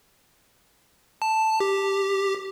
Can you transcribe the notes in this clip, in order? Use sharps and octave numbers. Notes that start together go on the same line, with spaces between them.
A5
G4